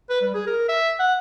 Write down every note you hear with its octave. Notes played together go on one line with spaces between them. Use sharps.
B4
G3
G#4
A#4
E5
F#5